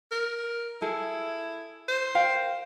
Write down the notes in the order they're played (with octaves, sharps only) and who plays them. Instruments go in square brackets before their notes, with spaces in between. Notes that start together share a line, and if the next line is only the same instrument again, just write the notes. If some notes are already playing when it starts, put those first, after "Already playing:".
[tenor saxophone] A#4
[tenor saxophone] E4 [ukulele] G#4 A4
[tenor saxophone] C5
[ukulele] A#4 F5 G5